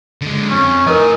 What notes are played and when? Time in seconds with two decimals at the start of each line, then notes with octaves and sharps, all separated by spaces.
0.22 D3 G#3
0.50 F2 C#4
0.87 A2 D#4 A#4 B4 D#5 G#5